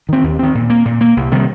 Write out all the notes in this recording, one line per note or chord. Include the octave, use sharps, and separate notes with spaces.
D#3 C4
D#2
D#3 C4
A#2
A#3
A#2
A#3
C2
C3 D#3 G3